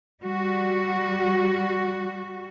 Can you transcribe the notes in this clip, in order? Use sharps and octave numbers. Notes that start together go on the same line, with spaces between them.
G3 F#4